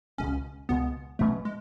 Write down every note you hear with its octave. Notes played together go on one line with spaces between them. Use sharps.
C#2 B2 G#3 C#4
C#2 B2 G#3 B3
B2 F#3 A3 C#4
G#3